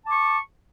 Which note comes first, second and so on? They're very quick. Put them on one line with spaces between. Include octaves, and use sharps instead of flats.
A5 D6 C#6